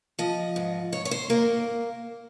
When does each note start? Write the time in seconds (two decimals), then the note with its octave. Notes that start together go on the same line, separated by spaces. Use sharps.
0.19 F3 D#5
0.56 G#2
0.92 G#2 C#5
1.05 C#5
1.11 C5
1.30 A#3 A#4